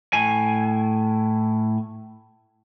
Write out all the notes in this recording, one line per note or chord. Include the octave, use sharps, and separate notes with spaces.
A2 G#5